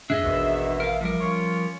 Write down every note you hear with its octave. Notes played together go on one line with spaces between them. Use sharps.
F2 D4 G#4 D#5 E5
A1 D#2 B2
A#4 F5
F3 G3 A#4
C#4 F4 C#5